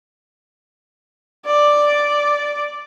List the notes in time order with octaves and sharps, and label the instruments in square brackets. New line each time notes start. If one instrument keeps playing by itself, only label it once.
[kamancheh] D5